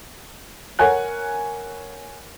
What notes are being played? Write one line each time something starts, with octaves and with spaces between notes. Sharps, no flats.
A#4 C#5 F#5 G#5 F#6